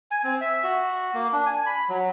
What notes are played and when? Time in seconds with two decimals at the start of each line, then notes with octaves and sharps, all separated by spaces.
0.11 G#5
0.24 C4
0.41 E5
0.64 F#4
1.14 A#3
1.33 D4
1.46 G#5
1.66 B5
1.89 F#3